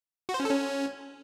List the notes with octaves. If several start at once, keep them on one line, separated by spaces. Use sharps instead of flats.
F#4
C5
C#4
A4
C#4